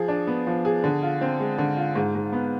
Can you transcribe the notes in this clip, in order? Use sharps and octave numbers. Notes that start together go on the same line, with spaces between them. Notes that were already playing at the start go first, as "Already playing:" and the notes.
Already playing: F3 G#4
D4
B3
F3
G#4
D3
F4
C4
G#3
D3
F4
G#2
G#2
B3